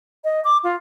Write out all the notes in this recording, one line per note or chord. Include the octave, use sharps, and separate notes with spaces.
D#5
D6
F4